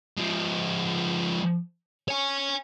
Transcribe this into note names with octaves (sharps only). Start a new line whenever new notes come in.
F3 G#3
C#5 G#5